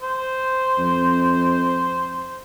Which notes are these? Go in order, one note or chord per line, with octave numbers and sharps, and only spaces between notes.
C5
F2